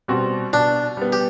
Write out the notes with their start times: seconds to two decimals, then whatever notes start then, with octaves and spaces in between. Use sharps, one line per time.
0.08 B2 G3 C4 F#4
0.53 B2 D4
0.97 G3 B3
1.13 G4